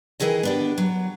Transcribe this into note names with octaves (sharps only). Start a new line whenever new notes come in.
D#3 E3 E4 G#4 D#5
B3 D4 G4
F#3